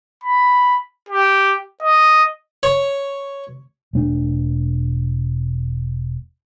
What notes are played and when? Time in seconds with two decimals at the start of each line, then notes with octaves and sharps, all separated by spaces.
0.24 B5
1.09 G4
1.83 D#5
2.63 C#5
3.93 E1 A3 D4